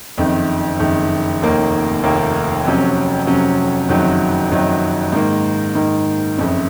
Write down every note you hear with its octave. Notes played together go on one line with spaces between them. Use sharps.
F#1 F2 D#3
F#1 F2 D#3
F1 D#2 D#3 A#3
F1 D#2 D#3 A#3
F2 C3 F#3 C#4
F2 C3 F#3 C#4
F#1 F2 D#3 F#3
F#1 F2 D#3 F#3
G#2 D#3 A#3
G#2 D#3 A#3
F#1 F2 C#3